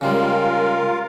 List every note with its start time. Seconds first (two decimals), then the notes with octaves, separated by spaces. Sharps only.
0.01 C#3 G3 G#3 F4 A#4 F5